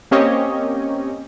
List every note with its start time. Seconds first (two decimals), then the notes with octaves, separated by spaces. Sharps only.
0.11 A#3 C4 C#4 G4 C#5 D#5